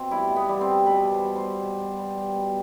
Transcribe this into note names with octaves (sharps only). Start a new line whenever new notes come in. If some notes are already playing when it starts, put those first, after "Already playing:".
Already playing: B2 C4
G3 E4
B2
B3
G3
C4
G3
B2 B4
B2
C5
G3
C5
G3
B2
B2
G3
G3
B2